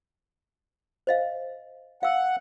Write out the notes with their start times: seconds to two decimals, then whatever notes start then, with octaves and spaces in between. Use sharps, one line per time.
1.07 C5 D#5 F5
2.03 F5 F#5 E6